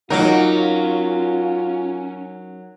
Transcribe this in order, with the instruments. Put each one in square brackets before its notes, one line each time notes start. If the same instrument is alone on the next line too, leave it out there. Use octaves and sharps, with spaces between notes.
[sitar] F#3 A#4 [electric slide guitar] C#4 [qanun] D#4 D6 [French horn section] F4